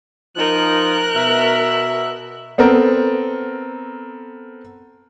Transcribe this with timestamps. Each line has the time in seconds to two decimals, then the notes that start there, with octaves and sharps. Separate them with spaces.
0.37 F3 D#4 A#4 F#6
1.15 B2 E5
2.58 B3 C4 A4 A#4